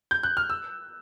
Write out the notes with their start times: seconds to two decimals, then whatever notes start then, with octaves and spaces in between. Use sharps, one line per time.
0.11 G6
0.23 F#6
0.37 F6
0.50 E6